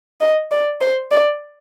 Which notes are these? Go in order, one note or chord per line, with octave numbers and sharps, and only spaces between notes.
D#5
D5
C5
D5